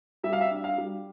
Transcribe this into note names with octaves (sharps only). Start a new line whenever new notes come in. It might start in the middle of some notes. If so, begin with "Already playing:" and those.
G3 E5
F5
E5
D4
F5
G3